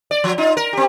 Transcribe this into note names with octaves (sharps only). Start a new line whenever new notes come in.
D5
F3
D#4 F4
A#4
C4 G4